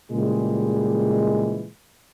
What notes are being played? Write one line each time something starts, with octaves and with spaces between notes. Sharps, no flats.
A#2 C#3 E3 G3 G#3